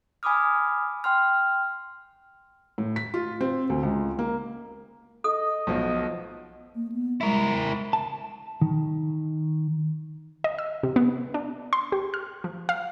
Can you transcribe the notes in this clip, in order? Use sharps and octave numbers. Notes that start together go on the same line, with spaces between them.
G#5 B5 D6 D#6 F6
G5 C6 F6
A2
B6
F4
C4
D2
C#2
A#3
A4 D#5 D#6
B1 B2 F3
A#3
B3
G#3 E4 A#4
A5
D#3
D#5
E6
C3
B3
D4
C6
G4
F6
F3
F5